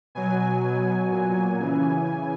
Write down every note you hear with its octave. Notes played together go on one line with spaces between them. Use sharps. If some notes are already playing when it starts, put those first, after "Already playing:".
B2 F#3 G#5
B2 F#3
A#2 F#3
C#3 E3